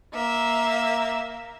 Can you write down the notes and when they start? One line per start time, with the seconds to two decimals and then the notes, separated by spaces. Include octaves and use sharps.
0.14 A#3 E5